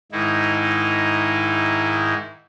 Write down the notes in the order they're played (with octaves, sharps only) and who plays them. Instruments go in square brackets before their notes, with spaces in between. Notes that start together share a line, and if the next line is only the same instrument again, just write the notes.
[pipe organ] G#2 D#3 D#4 E4